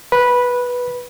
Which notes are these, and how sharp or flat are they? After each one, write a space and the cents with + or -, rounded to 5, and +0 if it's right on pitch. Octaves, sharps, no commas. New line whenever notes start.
B4 -10